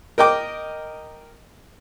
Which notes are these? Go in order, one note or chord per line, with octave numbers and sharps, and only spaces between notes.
A#4 D#5 G5 D6